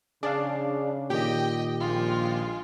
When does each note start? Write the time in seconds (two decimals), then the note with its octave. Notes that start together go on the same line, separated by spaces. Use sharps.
0.23 C#3 D4 G#4 D5 F5
1.10 A#2 D#3 G4 D#5 G5
1.80 A#1 G#3 F4